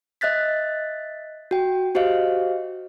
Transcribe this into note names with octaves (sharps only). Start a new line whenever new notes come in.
D#5 E5 F#6 A6 B6
F#4 G5
F#4 G4 C5 D#5 F5